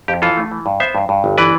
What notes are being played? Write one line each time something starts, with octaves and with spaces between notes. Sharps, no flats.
F2 G4
E3 F4 A4
A3
E3
G2
B3 C5 E5
G2
G2
G1
E3 B4 D5